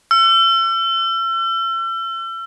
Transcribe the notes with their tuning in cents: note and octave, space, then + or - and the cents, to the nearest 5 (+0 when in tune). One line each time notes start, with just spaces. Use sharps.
E6 +40